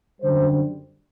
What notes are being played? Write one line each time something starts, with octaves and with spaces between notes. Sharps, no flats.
F#2 D3 G3 C5